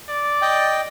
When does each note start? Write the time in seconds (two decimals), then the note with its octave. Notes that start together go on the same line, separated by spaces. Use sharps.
0.09 D5
0.42 D#5 G5